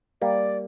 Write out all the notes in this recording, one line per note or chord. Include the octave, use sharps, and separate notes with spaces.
G3 A#3 D5